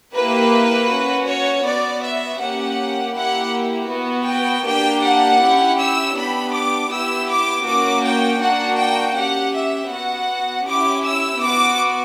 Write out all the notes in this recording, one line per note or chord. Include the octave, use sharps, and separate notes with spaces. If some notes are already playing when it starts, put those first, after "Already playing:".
A#3 E4 G4 B4
C#4 F#4
C#5
B3 F#4 D5
E5
A#3 C#4 G4 F#5
A#3 E4 G4 F#5
B3 F#4
G5
A#3 D4 G4 G5
F#5
C#4 E4 G4
E6
B3 D4 G4 B5
D6
B3 E4 G4 E6
D6
A#3 C#4 F#4 D6
G5
A#3 D4 F#4 F#5
G5
C#4 G4 F#5
E5
B3 F#4 F#5
C#4 E4 G4 D6
E6
B3 F#4 D6